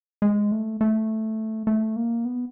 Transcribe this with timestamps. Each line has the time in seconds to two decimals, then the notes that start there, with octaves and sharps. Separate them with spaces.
0.22 G#3
0.52 A3
0.81 A3
1.67 A3
1.96 A#3
2.25 B3